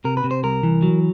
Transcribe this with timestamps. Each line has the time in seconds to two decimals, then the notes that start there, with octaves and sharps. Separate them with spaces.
0.04 C3 A#4
0.17 B4
0.24 C3
0.31 C5
0.43 C2 A#4
0.63 E3
0.82 F#3